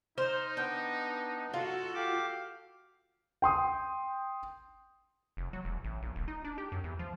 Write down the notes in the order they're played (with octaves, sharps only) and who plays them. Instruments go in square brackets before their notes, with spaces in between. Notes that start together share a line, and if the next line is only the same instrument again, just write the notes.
[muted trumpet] D#4 [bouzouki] C5 [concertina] F6
[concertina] B3 D4 [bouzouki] G5
[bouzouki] F4 [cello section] F#4 A4
[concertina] G4 D6 [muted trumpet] F5
[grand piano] G5 C6 D#6
[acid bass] F1
F#3
E1
A1
A#1
D#1
D#4
D4
G4
F#2
E2
F3